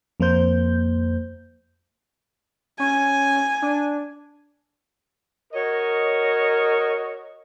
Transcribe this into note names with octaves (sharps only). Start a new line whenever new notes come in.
F2 A#3 A#4 C5 G6
C#4 G#5
D4
F#4 A#4 C#5 D#5